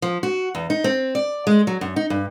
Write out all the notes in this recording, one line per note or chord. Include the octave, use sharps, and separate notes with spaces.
F3
F#4
E2
D#4
C4
D5
G#3
F#3
F#2
D#4
G2